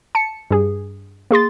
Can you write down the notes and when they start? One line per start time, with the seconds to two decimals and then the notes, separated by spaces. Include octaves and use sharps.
0.15 A5 C#7
0.51 G2 G#4
1.31 A#3 G#4 C6 A6